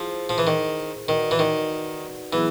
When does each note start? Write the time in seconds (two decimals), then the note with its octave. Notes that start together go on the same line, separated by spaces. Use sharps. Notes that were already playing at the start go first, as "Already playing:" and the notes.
Already playing: F3 E4 G#4 C5
0.29 F3
0.38 E3
0.47 D#3
1.08 D#3 D#4 F#4 B4 D5 F#5
1.31 E3
1.39 D#3
2.32 E3 F#3 B3 E4 G#4